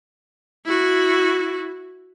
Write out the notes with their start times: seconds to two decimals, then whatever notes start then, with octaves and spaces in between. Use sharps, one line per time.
0.65 E4 F#4